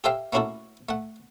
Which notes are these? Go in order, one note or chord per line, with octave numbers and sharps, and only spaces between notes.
G4 A4 C5 E5 F5 G5
A3 A#3 C#4 E4 F#4 A4
A3 F#5